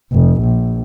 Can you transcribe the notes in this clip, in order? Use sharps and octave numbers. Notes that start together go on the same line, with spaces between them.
F1
A#1